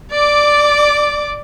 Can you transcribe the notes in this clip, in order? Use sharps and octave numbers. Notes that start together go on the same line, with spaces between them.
D5 D6